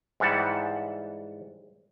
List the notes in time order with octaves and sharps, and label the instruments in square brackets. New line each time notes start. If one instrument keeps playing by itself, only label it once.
[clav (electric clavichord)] G#2 E3 G3 F#5 A5